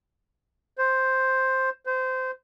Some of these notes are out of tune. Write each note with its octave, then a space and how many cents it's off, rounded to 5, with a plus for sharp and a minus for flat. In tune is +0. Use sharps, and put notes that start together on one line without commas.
C5 +5
C5 -20